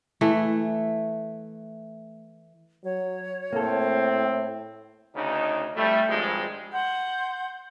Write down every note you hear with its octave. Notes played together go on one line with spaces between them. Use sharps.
E3 A3
F#3 C#5
A2 A#3 C4 A4
D2 C#3 D#4
F2 G3 A3
G#1 G2 F3 G#3
F#5 C6 G6